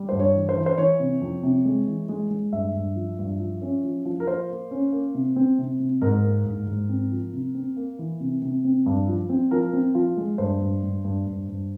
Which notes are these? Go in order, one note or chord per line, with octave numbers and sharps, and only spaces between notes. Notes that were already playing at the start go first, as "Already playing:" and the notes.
Already playing: G3
G2 C5
C#5
E3
C5
E3
C5
E3 C#5
C3
F2
C3
G#3
E3
G#3
G#3
G2 E5
G2
F3
G2
F3
C#4
F3
F3
A#4
A#3 C5
A#3
C#4
A#3
C3
C4
C3
C3
G#2 A#4
A#3
G#2
G#2
C4
F3
C3
C4
A#3
E3
C3
C3
C4
G2
F3
C4
F3 A#4
C4
F3 F4
G#3
G2 C5
G2
G2
G2
G2
G2